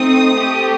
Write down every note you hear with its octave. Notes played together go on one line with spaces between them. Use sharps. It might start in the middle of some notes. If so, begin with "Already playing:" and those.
Already playing: A3 C4 D#4 D#6
A3 C4 G4